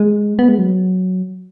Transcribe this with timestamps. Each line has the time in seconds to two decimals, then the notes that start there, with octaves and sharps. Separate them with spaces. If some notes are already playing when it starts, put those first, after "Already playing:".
Already playing: G#3
0.39 B3
0.49 G#3
0.59 F#3